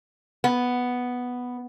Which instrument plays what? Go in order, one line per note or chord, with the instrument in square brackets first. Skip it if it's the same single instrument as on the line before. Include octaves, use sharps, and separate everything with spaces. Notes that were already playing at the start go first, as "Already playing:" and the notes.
[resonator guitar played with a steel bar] B3